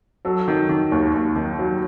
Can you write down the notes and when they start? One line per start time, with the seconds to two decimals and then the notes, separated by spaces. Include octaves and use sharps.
0.25 F#3 A4
0.48 D#3
0.69 D#3
0.92 D#2
1.14 D#2
1.36 D#3
1.59 F#3